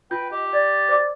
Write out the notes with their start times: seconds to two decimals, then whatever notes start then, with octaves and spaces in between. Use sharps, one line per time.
0.11 F4 B4 G5 G6
0.32 G4 D#5
0.53 D5 A6
0.89 C5 D5 D6